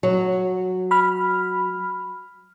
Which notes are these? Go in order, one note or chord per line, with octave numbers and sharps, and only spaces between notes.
F#3
B5 F6